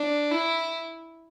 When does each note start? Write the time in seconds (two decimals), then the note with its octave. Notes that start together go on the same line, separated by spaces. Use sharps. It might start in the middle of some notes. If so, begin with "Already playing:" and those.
Already playing: D4
0.31 E4